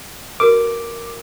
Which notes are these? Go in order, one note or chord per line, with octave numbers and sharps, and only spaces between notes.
F#4 A#4 B4 D6